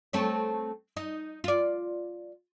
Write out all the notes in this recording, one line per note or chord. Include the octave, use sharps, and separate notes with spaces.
A3 C4 C#5
D#4
F4 D5